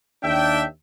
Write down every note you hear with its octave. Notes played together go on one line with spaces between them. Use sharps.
D#2 D4 E5 G5